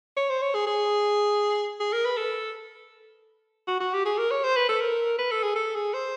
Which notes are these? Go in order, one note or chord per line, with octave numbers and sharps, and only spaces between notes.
C#5
C5
C#5
G#4
G#4
G#4
A#4
B4
A4
F#4
F#4
G4
G#4
A#4
C#5
C5
B4
A4
A#4
B4
A4
G#4
A4
G#4
C5